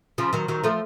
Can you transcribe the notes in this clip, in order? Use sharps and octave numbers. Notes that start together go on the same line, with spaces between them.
C#3 F3
D#3 F#3
D#3 F#3
F3 A3